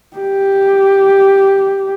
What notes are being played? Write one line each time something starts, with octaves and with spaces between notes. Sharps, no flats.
G4